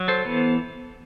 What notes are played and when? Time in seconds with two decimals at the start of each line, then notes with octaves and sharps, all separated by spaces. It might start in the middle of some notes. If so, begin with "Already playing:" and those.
Already playing: F#3
0.08 A4 C5
0.25 E3 B3